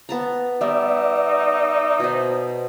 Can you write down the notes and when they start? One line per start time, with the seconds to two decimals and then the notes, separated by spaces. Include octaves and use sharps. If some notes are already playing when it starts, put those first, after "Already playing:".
0.09 B3 A5 A#5
0.61 G3 B3 D#4 D5 E5
2.00 B2 C5